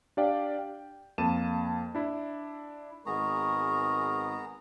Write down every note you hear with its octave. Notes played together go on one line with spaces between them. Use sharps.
D4 G4 D5 F5 G5
G5
F2 A#3 A5 D#7 E7
D4 E4
G#1 G#3 B3 G#4 A#4 A#5 C#6